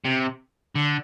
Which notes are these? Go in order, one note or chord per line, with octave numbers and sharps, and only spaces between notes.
C3
D3